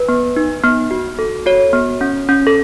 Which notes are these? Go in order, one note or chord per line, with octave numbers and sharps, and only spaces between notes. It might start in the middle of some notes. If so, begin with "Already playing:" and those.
Already playing: B4
B3
D#4
B3
F#4
A4
F#4 C#5
B3
C#4
C#4
A4